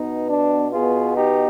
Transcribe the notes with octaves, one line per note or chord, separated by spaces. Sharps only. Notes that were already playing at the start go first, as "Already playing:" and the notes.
Already playing: B2 B3 D#4
D4
B2 B3 F4 G#4
D#4 G4